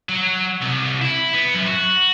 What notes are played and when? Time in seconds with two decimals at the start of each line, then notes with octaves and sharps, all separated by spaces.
0.09 F#3
0.62 C2
1.02 E4
1.33 B3
1.54 F#2
1.66 F#4